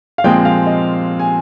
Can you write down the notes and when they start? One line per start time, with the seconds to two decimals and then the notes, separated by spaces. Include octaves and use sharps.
0.18 F5
0.24 A#2 F3 G#3 C4 G5
0.45 F5
0.67 D#5
1.20 G#5